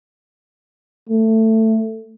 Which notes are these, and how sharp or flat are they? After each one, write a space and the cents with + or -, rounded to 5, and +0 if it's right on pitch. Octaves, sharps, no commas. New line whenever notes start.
A3 +15